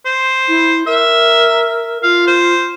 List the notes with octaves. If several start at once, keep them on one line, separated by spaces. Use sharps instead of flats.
C5
E4
A#4 E5
F4 F5
C5